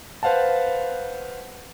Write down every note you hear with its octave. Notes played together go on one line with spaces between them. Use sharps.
B4 C5 F5 F#5 A5